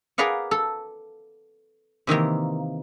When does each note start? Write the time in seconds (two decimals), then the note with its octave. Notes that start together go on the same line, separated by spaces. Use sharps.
0.18 G#4 A#4 B4 D5 F5 F#5
0.51 A4
2.07 C3 D#3 E3 A#3